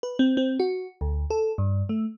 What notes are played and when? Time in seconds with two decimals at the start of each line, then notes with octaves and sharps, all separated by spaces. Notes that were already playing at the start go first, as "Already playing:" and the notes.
0.03 B4
0.19 C4
0.37 C4
0.60 F#4
1.01 D2
1.30 A4
1.58 G2
1.89 A3